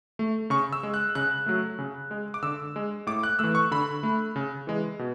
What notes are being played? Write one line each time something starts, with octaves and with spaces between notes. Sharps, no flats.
A3
C#3 C#6
E6
G#3
F#6
C#3 F#6
F#3 A3
C#3
G#3
D6
D3 E6
G#3
A2 D6
F#6
E3 A3 E6
C#6
D3 B5
A3
C#3
E3 G#3
B2